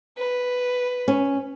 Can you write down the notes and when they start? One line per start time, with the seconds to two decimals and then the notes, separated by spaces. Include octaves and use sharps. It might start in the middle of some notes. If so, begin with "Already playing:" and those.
0.17 B4
1.08 C#4